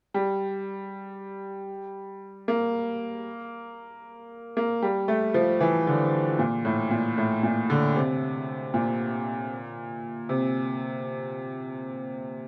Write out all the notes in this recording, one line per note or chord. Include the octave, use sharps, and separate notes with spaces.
G3
A#3
A#3
G3
A3
F3
E3
D3
A#2
A2
A#2
A2
A#2
D3
C3
A#2
C3